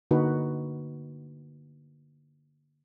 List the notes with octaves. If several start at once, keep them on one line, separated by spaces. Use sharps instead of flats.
D3 A#3 D#4 F#4 B4